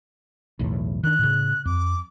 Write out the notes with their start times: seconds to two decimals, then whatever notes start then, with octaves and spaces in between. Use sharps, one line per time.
0.59 B1 E2 A2
1.03 D#3 D4 F#6
1.19 A2 C#3
1.65 F2 D6